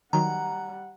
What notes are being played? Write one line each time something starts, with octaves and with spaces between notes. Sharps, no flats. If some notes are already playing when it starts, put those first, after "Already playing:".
D#3 F#3 G3 F#5 A#5